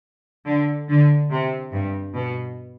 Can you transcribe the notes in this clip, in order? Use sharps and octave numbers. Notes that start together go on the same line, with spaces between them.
D3
D3
C3
G2
B2